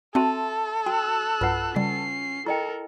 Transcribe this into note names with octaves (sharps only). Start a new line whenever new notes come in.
C4 F#4 A4 E5 A5 C6
F#4 G5 E6 F#6
B1 G2 F4 B4 F#5
C#3 G3 C#4 C7
E4 A4 A#4 D#5 G5